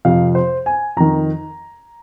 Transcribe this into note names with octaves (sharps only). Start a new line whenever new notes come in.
F2 C3 F3 F5
C5
G#5
F2 D#3 A#5